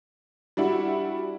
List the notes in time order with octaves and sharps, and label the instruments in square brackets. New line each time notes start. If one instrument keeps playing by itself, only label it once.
[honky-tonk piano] G3 D4 E4 F#4